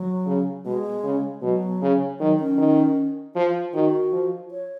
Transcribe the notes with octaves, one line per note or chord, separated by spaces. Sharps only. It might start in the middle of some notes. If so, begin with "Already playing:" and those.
Already playing: F#3
C#3
B2 G#3
C#3
B2 F#3
C#3
D#3 F#3
C#4
D#3
F3 F4
D#3 F#4
F3
C#5